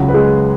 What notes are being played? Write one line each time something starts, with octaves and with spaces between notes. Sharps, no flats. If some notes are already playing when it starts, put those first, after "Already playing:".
Already playing: C#2 C#3 F#3 F#4
B4
G#3 G#4